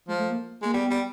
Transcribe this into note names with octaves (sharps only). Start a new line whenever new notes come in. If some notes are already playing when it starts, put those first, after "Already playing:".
F3 G#3
A3
A#3
G#3 A#3
G3 B3
G3